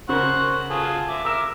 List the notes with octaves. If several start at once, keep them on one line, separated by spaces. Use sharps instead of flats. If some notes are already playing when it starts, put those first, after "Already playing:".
C#3 A#4 C5 F#5 C#6
F4 G#4 A4
E5 D6
A#4 E5 D6 E6 E7